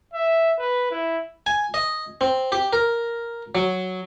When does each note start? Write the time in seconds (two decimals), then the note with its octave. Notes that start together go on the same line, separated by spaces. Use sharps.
0.13 E5
0.59 B4
0.91 E4
1.46 G#5
1.74 D#5
2.21 C4
2.52 G4
2.73 A#4
3.55 F#3